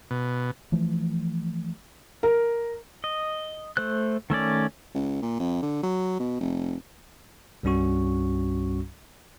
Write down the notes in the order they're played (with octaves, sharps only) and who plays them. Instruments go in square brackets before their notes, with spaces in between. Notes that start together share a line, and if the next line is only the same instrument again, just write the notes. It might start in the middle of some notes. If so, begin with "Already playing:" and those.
[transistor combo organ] B2
[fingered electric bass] E3 F3 A3
[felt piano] A#4
[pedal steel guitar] D#5
A3 C5 F#6
D#3 A3 C#4 D5
[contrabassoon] C#2
A#2
F2
D3
F#3
B2
F1
[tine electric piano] C2 G2 G3 C#4 F#4 C#6